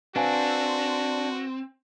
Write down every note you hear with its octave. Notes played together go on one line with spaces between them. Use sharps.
C4 D4 F#4 B4 F5 G#5